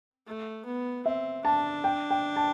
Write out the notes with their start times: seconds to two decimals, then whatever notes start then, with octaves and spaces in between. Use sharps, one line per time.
0.27 A3
0.66 B3
1.05 C4 E5
1.45 D4 A5
1.84 G5
2.10 G5
2.36 A5